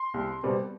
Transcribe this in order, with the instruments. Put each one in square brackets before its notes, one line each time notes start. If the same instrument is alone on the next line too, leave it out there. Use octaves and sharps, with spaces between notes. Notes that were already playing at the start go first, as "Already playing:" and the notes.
Already playing: [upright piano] C6
C2
B2 G3 C4